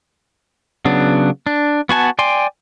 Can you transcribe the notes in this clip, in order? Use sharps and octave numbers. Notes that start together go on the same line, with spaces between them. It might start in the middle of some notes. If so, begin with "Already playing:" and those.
C#3 F#3 B3 D4
D4
B3 F#4 G#5 A5
D5 G5 G#5 C6